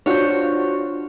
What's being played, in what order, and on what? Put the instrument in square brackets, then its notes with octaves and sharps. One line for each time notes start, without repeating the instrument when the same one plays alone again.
[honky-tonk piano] D4 F4 F#4 [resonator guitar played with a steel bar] C5 C#5